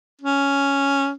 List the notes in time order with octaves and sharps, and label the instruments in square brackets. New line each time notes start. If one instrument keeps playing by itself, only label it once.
[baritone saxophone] C#4